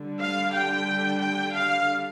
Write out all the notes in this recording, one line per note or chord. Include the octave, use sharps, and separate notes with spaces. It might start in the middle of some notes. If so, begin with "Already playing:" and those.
Already playing: D3 G3 D4
F5
G5
G5
F5